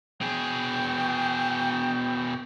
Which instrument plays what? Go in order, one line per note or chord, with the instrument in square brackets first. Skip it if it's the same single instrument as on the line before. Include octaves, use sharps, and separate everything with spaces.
[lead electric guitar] B2 G#4 [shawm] G5